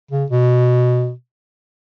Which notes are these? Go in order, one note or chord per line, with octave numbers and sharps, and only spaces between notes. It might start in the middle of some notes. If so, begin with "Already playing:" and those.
C#3
B2